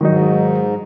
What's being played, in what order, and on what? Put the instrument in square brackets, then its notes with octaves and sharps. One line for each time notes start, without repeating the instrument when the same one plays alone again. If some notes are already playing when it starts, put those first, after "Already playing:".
[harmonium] G#2 [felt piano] D#3 F#3 D#4